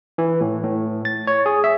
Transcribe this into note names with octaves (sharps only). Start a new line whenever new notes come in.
E3
A2
A2
A6
C#5
G#4
E5